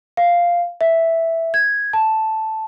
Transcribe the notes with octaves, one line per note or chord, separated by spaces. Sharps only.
F5
E5
G#6
A5